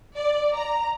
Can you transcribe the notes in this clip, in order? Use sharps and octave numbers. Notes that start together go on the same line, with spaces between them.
D5
A#5